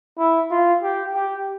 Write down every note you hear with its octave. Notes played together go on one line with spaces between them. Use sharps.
E4
F4
G4
G4